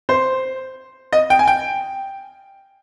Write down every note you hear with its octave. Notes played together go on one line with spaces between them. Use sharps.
C5
D#5
G5
G#5
G5